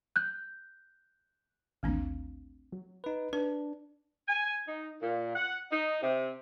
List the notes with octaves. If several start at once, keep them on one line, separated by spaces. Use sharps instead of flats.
F#6 G6
A1 D#2 A3 C4 D4
F#3
D#4 B4
D4 B4
G#5
D#4
A#2
F#5
D#4
C3